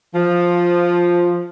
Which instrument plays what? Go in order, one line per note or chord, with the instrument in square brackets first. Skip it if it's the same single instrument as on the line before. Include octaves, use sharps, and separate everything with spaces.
[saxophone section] F3